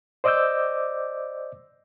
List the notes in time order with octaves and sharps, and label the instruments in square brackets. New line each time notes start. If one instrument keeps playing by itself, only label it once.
[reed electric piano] C5 D5 D#5 D6 E6 G6